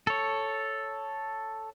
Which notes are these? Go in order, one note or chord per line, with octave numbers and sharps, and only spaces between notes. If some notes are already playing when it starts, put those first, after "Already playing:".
A4 C#5